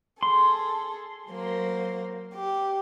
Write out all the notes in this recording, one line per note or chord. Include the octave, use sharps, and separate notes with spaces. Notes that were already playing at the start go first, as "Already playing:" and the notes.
G#4 A4 C6
F#3 A#3 C5
G4